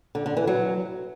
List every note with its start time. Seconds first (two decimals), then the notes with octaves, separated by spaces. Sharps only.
0.15 D3
0.26 D3
0.37 E3
0.47 F#3